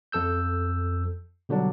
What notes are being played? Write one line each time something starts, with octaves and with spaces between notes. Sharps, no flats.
F2 A4 E6 G6
B2 D3 F#3 G3 D4